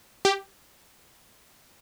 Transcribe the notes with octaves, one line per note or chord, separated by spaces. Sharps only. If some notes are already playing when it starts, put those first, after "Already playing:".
G4